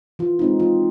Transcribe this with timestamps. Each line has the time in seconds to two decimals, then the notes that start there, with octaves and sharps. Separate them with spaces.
0.19 E3 F4
0.39 G#3 C4 D#4
0.60 E3 F4